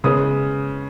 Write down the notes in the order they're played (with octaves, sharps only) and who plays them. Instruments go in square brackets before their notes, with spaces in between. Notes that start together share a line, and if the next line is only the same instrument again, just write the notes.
[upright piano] C#3 G#3 B3 D#6